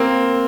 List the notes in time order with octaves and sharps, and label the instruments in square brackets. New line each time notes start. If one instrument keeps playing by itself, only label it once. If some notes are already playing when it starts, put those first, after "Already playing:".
Already playing: [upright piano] A#3 C4